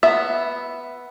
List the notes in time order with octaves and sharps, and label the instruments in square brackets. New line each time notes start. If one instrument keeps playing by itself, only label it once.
[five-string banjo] B3 E5